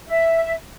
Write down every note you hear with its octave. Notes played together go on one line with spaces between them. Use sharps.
E5